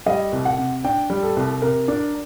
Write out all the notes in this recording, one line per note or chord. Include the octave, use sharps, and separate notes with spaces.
G3 D#5
C2
F#5
C3
D4 G5
G3
A4
C2
C3 A#4
D4